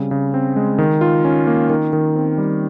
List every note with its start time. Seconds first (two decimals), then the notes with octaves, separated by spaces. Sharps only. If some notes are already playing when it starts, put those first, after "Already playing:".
Already playing: C#3 G3 C4
0.11 C#3
0.34 C4
0.56 G#3
0.78 D#3
1.01 F4
1.25 C#4
1.47 A#3
1.70 D#3
1.93 D#3
2.15 C4
2.38 G3